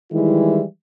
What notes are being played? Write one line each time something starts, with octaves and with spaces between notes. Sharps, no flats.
D#3 E3 G3 G#3 E4